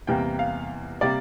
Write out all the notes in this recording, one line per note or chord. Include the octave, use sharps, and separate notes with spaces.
E2 C3 G3 A#3 G5
F5
C3 G3 A#3 D5